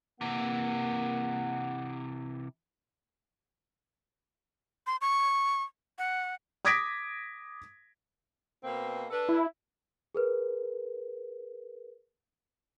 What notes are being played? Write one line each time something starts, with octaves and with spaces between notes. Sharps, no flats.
C3 E3 A#3 F#5
C6
C#6
F#5
D6 D#6 G#6 A#6 B6 D7
B2 A#3 C4
D4 A4 B4
E4
G#4 A#4 B4